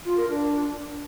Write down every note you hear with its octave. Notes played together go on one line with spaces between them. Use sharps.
F4
A#4
D4